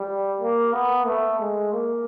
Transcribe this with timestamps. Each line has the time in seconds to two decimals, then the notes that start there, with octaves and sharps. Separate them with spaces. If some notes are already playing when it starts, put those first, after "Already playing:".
Already playing: G3
0.40 A#3
0.73 B3
1.06 A3
1.40 G#3
1.73 A#3